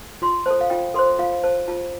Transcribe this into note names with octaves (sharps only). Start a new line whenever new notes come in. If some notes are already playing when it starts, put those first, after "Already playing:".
F4 C6
A4 C5 A5
F5
F4 G5
A4 C5 C6
F4 F5
C5 A5
F4 A5